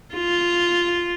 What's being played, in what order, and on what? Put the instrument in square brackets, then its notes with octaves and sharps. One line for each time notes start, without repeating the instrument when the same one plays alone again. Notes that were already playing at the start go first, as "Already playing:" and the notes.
[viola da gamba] F4